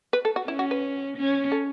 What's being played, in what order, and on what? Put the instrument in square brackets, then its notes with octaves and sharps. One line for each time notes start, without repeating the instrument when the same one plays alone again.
[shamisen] B4
A4
F#4
[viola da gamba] C#4 [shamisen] E4
[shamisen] F#4
B4
[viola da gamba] C#4
[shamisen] A4